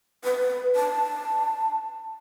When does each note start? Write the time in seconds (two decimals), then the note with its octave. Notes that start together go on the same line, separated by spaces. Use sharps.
0.24 B4
0.76 A5